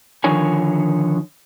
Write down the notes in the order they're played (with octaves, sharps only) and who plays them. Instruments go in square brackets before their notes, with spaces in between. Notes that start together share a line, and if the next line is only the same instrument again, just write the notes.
[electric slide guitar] D3 D#3 F3 D#4 C#5 G#5